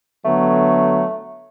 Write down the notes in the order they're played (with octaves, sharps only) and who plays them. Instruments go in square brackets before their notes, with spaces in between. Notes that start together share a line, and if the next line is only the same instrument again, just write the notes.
[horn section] D3 F#3 B3 [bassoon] A3